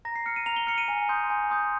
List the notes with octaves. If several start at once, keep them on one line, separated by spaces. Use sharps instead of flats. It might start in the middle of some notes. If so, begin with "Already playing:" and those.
A#5 A#6
C7
F6 C#7
D#7
A#5 F7
G7
F6 C#7
D#7
G#5
C6 D#6 G6
G#5
C6 D#6 G6